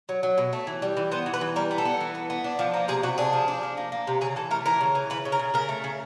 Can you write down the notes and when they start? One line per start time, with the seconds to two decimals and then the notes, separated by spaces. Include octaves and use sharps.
0.09 F#3
0.23 F#3
0.38 B2
0.53 A3
0.67 E3
0.82 G3
0.97 E3
1.12 B3 C5
1.26 E3
1.33 B4
1.41 E3
1.56 G3 A#4
1.71 B3
1.78 A4
1.85 B3
2.00 E3
2.15 B3
2.30 B3
2.44 D4
2.59 F3
2.74 A#3
2.88 C3 G#4
3.03 C3 F#4
3.18 D4 G#4
3.33 F3
3.48 D4
3.63 F3
3.77 A#3
3.92 A#3
4.07 C3
4.21 C#3 G#4
4.36 E3 A4
4.51 A3 A#4
4.66 E3 A#4
4.81 C#3
4.95 E3
5.10 C#3 B4
5.25 C#3
5.32 A#4
5.39 C#3
5.54 C#3 A#4
5.69 A3
5.84 C#3